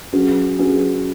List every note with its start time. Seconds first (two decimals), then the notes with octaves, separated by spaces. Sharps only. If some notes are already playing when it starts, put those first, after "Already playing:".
0.13 F#3 C#4 G#4 B4
0.59 F#3 C#4 G#4 B4